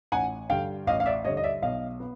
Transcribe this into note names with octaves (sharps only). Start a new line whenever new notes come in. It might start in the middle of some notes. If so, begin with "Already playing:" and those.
A1 F#5 G#5
G2 D3 F5 G5
A1 D#5 F5
F5
D5 E5
G2 D3 C#5 D#5
D#5
D5 E5
B1 D#5 F5
B3